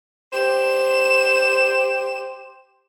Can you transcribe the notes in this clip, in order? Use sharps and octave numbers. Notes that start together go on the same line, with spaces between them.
G4 C5 E7